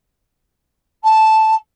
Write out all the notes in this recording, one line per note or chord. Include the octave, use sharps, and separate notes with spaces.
A5